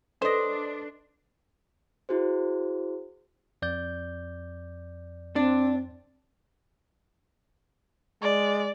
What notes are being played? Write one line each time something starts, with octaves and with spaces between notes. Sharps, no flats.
D4 A4 B4 C5 D#5 A#6
E4 F#4 G#4 C5
F2 D5 G6
C4 D4
G#3 D5